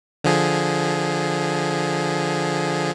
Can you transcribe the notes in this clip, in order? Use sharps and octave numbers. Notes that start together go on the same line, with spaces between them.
D3 F3 G#4